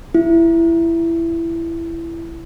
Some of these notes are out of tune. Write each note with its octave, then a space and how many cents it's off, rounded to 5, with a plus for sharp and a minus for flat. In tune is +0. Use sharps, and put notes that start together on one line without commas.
E4 +15